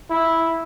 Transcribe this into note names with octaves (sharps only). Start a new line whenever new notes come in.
E4